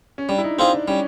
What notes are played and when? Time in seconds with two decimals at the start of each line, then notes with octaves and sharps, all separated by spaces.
0.18 C#4
0.29 G3 D4
0.38 E4
0.44 D#4
0.58 C4 D#4 F4 G#4
0.73 D4
0.88 G3 C#4